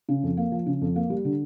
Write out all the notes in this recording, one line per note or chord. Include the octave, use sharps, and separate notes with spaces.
C#3
F2
A#3
F3
C#3
F2
A#3
G3
D3